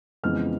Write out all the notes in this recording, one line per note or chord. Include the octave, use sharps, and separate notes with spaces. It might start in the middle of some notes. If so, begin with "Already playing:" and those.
F2 C#3 E3 G#3 B3 F6